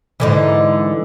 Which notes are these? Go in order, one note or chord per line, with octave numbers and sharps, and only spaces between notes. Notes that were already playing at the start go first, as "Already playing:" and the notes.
G#2 D3 E3